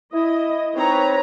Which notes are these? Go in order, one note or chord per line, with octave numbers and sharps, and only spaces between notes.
E4 D#5
C4 D#4 B4 C#5 A#5